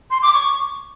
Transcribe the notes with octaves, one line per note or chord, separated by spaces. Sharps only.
C6
D6
C#6